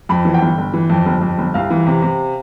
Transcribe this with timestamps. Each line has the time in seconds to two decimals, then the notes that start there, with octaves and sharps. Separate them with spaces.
0.09 F2 B5
0.25 E3
0.34 G5
0.41 G1
0.58 G1
0.73 E3
0.90 F2
1.06 G1
1.21 F2
1.38 G1
1.54 C2 F5
1.70 E3
1.87 C3
2.02 C3